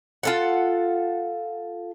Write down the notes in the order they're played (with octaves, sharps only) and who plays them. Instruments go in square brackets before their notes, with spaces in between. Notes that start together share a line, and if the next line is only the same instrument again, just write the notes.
[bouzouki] F4 A4 F#5